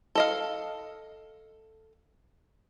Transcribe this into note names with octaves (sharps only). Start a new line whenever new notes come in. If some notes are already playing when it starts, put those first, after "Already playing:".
A4 D#5 F5